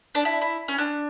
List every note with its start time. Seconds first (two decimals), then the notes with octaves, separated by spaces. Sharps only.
0.15 D4
0.25 E4
0.41 E4
0.68 C#4
0.78 D4